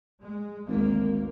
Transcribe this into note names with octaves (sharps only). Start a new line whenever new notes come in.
G#3
G#1 D2 A#3